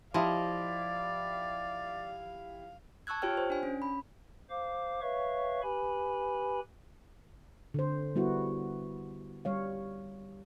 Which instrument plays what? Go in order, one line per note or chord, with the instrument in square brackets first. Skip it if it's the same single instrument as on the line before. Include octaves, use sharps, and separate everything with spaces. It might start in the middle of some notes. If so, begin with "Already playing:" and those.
[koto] F3 D#5 [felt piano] E4 G4 [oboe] D5 [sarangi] F5
[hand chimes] A5 C#6 E6 F#6 G#6
F4 G4 C#5 G5 F6
C5
D4 G#5
C#4
B5
[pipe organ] C5 F5 D6
B4 C#5 E5 F5 C#6
G4 B4 G#5 B5
[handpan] D3 C5
G3 B3 E4 F#4
G3 C#5 F5